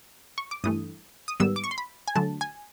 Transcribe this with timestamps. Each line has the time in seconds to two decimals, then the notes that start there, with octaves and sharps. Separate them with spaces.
0.38 C#6
0.51 D6
0.64 G2 E3 A3 D#6
1.28 D#6
1.40 G#2 D#3 G3 B3 E6
1.56 D6
1.64 C#6
1.71 C6
1.78 B5
2.08 G#5
2.16 D3 F#3 A3 A5
2.41 G#5